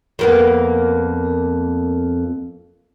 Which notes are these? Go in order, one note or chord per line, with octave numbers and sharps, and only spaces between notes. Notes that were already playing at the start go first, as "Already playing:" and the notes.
F2 A#3 B3